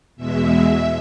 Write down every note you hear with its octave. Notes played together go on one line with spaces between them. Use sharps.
E2 B2 G#3 E5